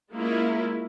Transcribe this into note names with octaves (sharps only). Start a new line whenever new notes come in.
G#3 A#3 C#4 E4 F4